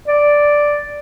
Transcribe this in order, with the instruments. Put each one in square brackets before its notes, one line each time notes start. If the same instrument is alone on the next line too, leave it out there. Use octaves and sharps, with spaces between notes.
[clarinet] D5